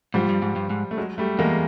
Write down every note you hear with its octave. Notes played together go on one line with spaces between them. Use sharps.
G#2 F3 G3
G2
G#2
G2
G#2
A3
F#3 G#3
G3 A3
E2 G#3 A#3